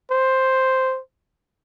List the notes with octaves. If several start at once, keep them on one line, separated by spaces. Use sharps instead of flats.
C5